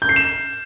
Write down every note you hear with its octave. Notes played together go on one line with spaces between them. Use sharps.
G6
C7
E7